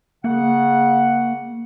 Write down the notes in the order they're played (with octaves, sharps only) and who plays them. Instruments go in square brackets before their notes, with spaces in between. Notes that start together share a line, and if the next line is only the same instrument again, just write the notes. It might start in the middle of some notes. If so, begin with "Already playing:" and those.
[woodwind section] C#3 F#5 [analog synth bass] A#3